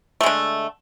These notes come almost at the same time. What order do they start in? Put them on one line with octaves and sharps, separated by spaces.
A3 G#3 D3